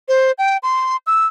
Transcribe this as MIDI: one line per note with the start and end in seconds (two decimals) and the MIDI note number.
0.08 0.32 72
0.38 0.57 79
0.63 0.96 84
1.07 1.27 88